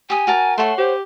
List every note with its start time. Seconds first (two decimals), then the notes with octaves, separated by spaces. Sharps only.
0.10 G4 G#5 D#6
0.27 F#4 A#4 A5
0.58 A3 C#5 F#5 A5 C6
0.78 G4 C5